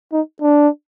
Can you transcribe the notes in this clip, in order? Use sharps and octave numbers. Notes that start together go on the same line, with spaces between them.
D#4
D4